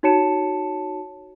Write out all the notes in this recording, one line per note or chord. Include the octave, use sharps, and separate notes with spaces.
D#4 F#4 C#5 A5 C#7 E7